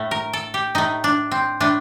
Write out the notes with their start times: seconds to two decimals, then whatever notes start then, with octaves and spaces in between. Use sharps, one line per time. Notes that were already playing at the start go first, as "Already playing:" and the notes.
Already playing: A2 A3
0.11 A#4
0.33 A4
0.54 G4
0.75 A2 A3 D#4
1.04 D4
1.31 C4
1.60 A2 A3 D4